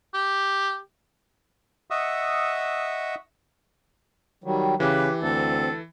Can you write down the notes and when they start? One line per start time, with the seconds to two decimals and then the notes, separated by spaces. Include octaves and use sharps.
0.14 G4
1.90 D#5 E5 F#5 C#6 D#6 E6
4.44 D#3 F#3 G3
4.80 C#3 E3 G4 B4
5.22 D2 C4 A4